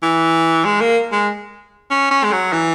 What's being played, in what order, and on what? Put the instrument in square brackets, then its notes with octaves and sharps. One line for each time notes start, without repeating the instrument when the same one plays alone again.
[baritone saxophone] E3
G#3
A#3
G#3
C#4
C#4
G#3
F#3
E3